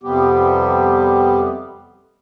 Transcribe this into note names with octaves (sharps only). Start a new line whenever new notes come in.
F2 C3 G3 B3 G4